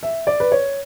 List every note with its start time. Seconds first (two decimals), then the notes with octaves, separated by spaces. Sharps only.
0.03 E5
0.27 D5
0.40 B4
0.52 C#5